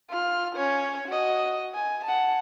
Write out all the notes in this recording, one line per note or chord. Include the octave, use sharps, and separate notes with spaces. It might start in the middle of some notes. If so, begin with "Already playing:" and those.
F4 F6
C#4 C#5
F#4 D#5
G#5
F#5 A5